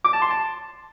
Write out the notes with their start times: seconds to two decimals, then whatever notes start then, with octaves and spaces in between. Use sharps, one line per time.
0.04 D6
0.13 A5
0.22 C6
0.30 A5